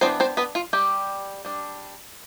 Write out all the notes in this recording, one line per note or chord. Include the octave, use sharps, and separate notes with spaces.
E3 B3 C4 D4 C5
C4 C5
B3 B4
F4
G3 G4
G3 D4